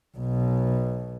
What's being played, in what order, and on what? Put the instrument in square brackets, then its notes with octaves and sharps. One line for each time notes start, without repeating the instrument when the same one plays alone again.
[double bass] B1 B2